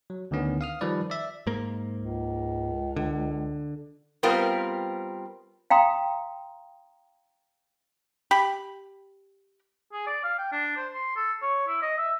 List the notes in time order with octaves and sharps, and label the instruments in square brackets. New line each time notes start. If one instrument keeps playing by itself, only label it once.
[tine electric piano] F#3
D2 D3 D#3 B3 C#4
F5 D#6 F6
D#3 F3 G3 B4 D5
D5 E5
[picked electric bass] G#2 A#3
[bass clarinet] C#2
[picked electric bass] D3
[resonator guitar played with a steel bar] G3 B3 C4 F4 A#4
[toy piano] F5 G5 A#5 C6 D#6
[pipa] G4 B5
[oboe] G#4
D5
F5
G5
D4
C5
C6
A4
C#5
E4
D#5
E5